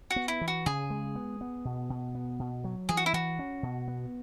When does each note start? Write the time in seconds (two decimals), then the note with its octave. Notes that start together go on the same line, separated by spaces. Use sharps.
0.10 F#4
0.16 B3
0.28 E4
0.41 E3
0.48 F#4
0.66 C#3 G#4
0.90 G#3
1.15 B3
1.41 B3
1.65 B2
1.90 B2
2.15 B3
2.39 B2
2.64 F#3
2.89 E3 G#4
2.97 F#4
3.06 E4
3.13 E3 F#4
3.39 C#4
3.63 B2
3.88 B3